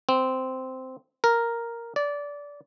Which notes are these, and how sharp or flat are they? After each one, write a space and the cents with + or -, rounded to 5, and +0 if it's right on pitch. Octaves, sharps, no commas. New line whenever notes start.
C4 -10
A#4 +0
D5 -20